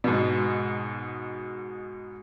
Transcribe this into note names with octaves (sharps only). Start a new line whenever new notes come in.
G#2 B2